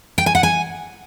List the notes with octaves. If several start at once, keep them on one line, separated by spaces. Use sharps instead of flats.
G5
G#5
F#5
G#5